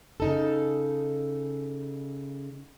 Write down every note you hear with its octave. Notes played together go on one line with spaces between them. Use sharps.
C#3 D#4 A4